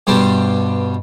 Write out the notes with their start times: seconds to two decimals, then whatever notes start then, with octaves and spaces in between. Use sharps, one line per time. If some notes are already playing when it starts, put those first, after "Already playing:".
0.07 G2 B2 G3 C5 A5